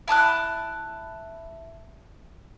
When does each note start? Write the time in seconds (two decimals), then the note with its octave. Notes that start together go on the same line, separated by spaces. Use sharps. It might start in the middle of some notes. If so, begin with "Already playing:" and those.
0.08 E4 A5 D#6 F#6